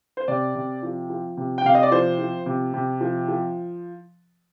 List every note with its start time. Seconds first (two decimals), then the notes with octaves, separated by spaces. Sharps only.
0.17 C5
0.28 C3 D5
0.55 C3
0.83 F3
1.10 F3
1.37 C3
1.58 G5
1.64 C3 F5
1.75 D#5
1.83 D5
1.92 F3 C5
2.19 F3
2.46 C3
2.74 C3
3.01 F3
3.28 F3